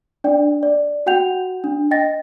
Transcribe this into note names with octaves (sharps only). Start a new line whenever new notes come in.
D4 D5 G5
D5
F#4 F#5 G5 G6 F7
D4
D#5 G5 A6 A#6